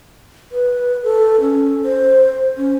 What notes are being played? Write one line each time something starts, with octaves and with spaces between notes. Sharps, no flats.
B4
A4
C#4
C5
C#4